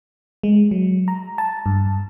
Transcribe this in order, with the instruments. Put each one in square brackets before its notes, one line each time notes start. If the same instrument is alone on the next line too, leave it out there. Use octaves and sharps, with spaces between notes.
[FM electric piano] G#3
F#3
A#5
A5
G2